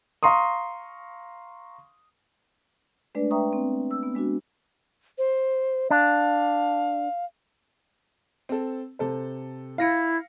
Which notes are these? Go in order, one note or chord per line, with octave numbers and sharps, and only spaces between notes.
F5 A#5 C6 C#6 D#6
G#3 A3 D4 B4 D5
B4 E5 G5 A#5 C#6 D#6
B3 C4
E6
B3
G#3 D4 F#4
C5
D4 F5
C4 A4
C3 A4 C5
E4 F5 A#6 C#7